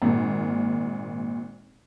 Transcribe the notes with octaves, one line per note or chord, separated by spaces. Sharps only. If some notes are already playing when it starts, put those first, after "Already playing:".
G#1 A#2